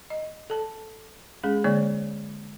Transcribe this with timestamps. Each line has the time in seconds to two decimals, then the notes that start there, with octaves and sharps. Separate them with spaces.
0.10 D#5
0.50 A4 A5
1.44 G#3 C#4 G#4
1.64 D3 G#3 A#3 C#5 D5